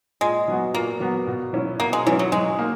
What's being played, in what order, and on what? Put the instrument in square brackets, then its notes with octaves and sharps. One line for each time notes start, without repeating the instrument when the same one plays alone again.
[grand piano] A#2 [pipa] G#3
[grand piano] F#3 B3 F#4
[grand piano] A#2 [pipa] A#3
[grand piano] F#3 B3 F#4
B2
F#3 C#4 E4
[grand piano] B2 [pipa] A#3
[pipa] G#3
[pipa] E3 [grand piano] F#3 C#4 E4
[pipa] F#3
[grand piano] F#3 [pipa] G#3
[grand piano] A#3 D#4